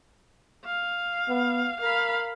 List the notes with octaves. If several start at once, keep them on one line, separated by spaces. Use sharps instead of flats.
F5
B3
A#4 F5 B5